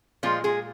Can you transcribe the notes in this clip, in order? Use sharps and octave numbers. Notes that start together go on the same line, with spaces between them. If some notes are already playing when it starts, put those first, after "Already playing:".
A#2 F3 G#3 F4
G#3 G#4